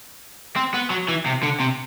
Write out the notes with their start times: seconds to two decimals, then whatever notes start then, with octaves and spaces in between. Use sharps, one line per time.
0.56 C4
0.74 B3
0.90 F#3
1.09 E3
1.26 C3
1.43 D3
1.60 C3